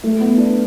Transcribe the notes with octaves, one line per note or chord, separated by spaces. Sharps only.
A3
B3
D4